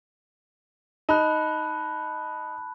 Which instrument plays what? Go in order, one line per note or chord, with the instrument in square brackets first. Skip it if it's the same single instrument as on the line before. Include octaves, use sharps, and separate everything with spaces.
[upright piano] D#4 [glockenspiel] A5 B5 F#6